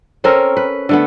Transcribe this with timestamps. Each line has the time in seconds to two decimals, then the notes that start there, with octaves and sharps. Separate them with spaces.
0.24 C4 C#4 A4 A#4
0.57 B4
0.89 D3 A3 B3